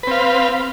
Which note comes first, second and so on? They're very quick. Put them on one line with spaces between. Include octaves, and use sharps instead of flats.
B4 C4 F5